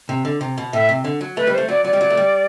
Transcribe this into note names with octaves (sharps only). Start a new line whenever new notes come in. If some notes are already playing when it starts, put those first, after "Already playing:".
C3
D3
C3
B2
A2 E5
C3
D3
F#3
A3 B4
G3
A3 C5
F#3 D5
F#3 D5
G3
F#3
A3
G3